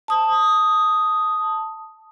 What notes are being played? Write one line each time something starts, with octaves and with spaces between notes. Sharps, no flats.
A5 D#6